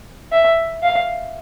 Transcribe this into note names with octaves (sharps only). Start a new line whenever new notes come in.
E5
F5